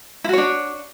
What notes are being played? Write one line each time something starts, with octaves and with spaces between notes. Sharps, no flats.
D4 E4 F#4 C#5